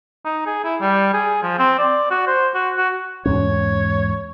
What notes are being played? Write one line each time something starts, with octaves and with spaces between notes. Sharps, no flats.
D#4
G#4
E4
G3
G#4
F3
C4
D5
F#4
C5
F#4
F#4
E2 G#2 C#4 C#5